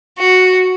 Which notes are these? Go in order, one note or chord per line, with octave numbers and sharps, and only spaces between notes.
F#4